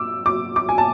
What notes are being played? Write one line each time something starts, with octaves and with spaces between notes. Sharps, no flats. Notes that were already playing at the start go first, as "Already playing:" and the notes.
Already playing: D6 E6
D6
D6
G#5
A5